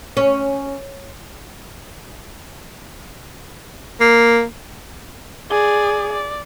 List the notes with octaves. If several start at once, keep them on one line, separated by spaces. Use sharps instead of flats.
C#4
A#3
G#4 D5
D5